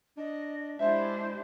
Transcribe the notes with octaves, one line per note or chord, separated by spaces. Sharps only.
D4 D#5
G#3 D4 E4 G4 C5 E5 A5